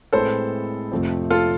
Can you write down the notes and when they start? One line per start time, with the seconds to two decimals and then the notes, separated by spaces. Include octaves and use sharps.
0.13 A2 G#3 C4 E4 A4 B4 C5
0.92 F2 C3 F3 A3 C4
1.30 F4 A4